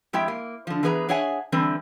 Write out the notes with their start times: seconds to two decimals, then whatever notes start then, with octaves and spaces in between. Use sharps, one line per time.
0.13 F2 G#3 E4 G4 E5 G5
0.28 A#3
0.67 D3 F3
0.83 E3 B3 G#4 B4 E5 A#5
1.09 D4 G#4 C#5 E5 F#5 G#5
1.52 D3 E3 G3 C4 B4